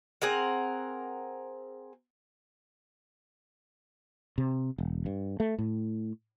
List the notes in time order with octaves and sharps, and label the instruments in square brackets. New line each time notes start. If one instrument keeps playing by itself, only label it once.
[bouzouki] C4 G#4 A#4 F#5
[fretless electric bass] C3
E1
G2
A3
A2